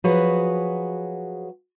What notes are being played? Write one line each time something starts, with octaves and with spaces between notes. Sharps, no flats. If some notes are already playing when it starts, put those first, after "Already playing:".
F3 F#3 F#4 G#4 B4 C#5